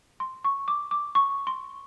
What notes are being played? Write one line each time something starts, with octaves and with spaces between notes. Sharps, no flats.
C6
C#6
D6
D6
C#6
C6